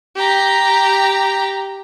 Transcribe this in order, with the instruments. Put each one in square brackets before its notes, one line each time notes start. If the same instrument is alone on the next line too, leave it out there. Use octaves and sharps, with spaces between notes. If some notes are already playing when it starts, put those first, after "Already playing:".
[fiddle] G4 A#5